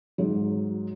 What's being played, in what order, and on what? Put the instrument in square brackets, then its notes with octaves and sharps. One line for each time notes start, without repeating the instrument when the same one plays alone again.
[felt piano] G#2 F#3